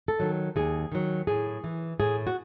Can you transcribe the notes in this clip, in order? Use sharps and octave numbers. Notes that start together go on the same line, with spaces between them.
A4
D#3 F#3
D#2 G#4
D#3 F#3
A2 G#4
E3
A2 G#4
F#4